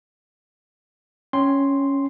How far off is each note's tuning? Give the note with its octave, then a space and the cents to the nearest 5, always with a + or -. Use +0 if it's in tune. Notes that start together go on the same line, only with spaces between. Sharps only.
C#4 +0 G5 +0 C6 +0